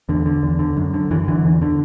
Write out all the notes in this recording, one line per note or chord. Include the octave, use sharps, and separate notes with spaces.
E2 D3
D3
E2
D3
F#2
D3
F#2 E3
D3 E3
E2
D3